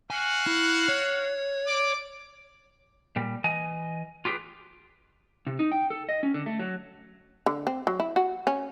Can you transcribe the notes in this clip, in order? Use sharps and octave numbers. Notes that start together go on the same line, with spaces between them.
F#4 F5 F#5 G#5
E4
C#5
D5 D6
A#2 G3
E3 D#5 G#5
F4 G4 G#4 A#4 B4
C3
D#4
G5
A4
D#5
C#4
D3
A3
F#3
D3
C4
F#3
E4
F#4
C#4